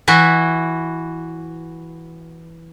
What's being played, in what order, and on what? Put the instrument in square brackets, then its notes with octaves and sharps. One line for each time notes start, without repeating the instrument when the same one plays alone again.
[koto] E3 E4 F#4